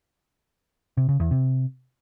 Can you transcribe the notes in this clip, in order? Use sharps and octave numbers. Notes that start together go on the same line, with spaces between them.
C3
C#3
E2
C3